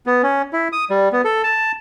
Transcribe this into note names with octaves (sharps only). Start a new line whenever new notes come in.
B3
C#4
E4
D#6
G3
B3
A4
A5